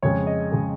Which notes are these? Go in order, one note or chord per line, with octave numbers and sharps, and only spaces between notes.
F2 C#3 G#3 C#5
D#5
C#3 G#3